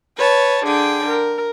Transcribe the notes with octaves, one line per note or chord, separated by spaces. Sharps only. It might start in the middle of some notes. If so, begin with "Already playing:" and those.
B4 C#5 A5
D3 G#4 G5
A#4